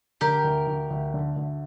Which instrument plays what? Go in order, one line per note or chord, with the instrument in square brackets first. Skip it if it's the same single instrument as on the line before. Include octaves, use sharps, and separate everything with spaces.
[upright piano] D3 [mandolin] G4 A#4
[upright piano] D2
D2
D2
D3
D2